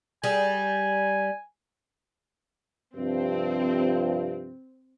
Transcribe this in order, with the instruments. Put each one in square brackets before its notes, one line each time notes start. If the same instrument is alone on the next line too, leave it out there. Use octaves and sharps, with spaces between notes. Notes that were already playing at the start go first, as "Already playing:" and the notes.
[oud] G3 G#4 [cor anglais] G#5
[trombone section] G2 C3 F3 [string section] C4